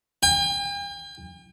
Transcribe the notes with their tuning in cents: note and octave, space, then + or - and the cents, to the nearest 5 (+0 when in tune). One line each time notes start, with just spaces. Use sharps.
G5 +45